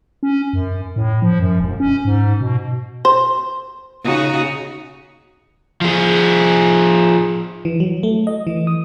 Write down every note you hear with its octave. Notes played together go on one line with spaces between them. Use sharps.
C#4
F#2
A2
F3
F#2
E1
C#4
G#2
B2
C5
C#3 D#4 F#4
F3 G#4
E3
F#3
A3
D#5
E3
D#6